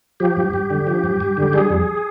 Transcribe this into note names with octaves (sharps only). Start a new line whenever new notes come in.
F3 G4
G2
G2
D3
F3
G2
G2
D3
G3 G#4
F2